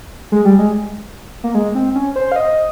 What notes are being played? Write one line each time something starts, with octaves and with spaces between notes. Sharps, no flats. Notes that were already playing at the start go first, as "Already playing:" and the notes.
G#3
G3
G#3
A#3
G#3
C4
C#4
C5
F5
D#5